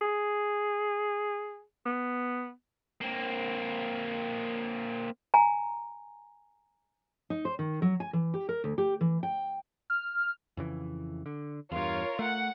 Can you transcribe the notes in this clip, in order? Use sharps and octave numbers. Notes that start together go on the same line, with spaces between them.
G#4
B3
A#3 C4
G#5 A#5
D#4
C5
D#3
F#3
G#5
E3
G4
A#4
D2
G4
E3
G5
F6
F2 C#3 E3
D3
E2 G2 F4 A#4 C#5
A3 F#5